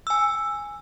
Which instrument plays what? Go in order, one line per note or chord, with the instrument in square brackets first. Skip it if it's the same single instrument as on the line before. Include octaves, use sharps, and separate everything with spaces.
[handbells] G#5 E6